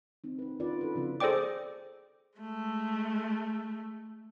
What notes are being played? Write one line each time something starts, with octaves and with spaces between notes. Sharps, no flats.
D#3 C4 D#4
D#4 B4
D#3 C#4 D#4 F4 B4 D5
E4 A4 B4
C#3 F3 C4 F4
G#4 A4 C5 D5 G5 D6
G#3 A3